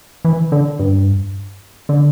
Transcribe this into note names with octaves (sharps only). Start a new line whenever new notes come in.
E3
D3
G2
D3